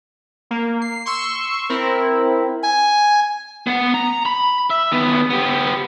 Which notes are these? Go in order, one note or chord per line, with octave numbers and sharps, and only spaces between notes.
A#3
C7
C6 C#6 E6
C4 E4 A#4
G#5
B3 F#5
A#5
B5
E5
D#3 B3
B3 G4